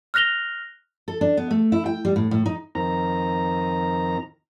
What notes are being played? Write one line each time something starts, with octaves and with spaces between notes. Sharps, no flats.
F6 F#6 A#6 F7 G7
A4
D4
B3
A3
E4
G5
G3
A2
A2
D#4
F2 D#3 A#5